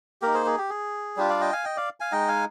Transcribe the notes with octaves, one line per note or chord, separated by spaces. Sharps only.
A#3 D#4 G4 A#4
G#4 C5
G#4
G4
G#4
G3 D4 F4 G4
D5 F5
D#5 G5
F5 G#5
D#5 G5
D5 F5
F5 G#5
G#3 D#4 D#5 G5
F5 G#5